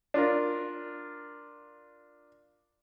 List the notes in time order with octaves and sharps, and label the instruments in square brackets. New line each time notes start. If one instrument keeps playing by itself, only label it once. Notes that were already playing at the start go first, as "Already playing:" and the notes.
[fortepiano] D4 F4 A#4